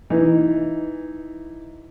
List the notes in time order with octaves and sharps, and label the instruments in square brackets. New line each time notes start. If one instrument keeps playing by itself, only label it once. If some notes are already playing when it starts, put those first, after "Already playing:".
[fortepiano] E3 D#4